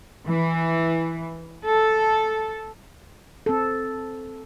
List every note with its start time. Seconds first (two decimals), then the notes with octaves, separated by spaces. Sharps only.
0.26 E3
1.66 A4
3.46 C4 A4